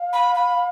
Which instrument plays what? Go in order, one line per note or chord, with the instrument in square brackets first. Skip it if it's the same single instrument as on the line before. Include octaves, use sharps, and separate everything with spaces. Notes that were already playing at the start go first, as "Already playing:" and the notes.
Already playing: [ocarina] F5
[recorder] B5
B5